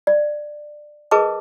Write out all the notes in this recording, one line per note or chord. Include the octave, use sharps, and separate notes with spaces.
D5
G#4 A#4 B4 D#5 A5 D6